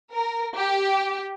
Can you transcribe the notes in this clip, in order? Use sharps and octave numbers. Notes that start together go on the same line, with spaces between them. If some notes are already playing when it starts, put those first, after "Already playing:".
A#4
G4